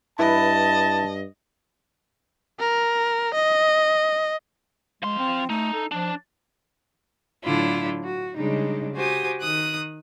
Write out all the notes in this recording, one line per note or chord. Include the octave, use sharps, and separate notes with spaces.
G2 E4 B4 D#5 A5
A#4
D#5
F3 G#3 C6
C4
A3 D#4
A4
F3 D4
A2 D3 F#3 D4 E4 F4
F#4
C#3 G3 G#3 D4 D#4
F#4 G4 C5 G#5 D#6
D#3 D#6 F#6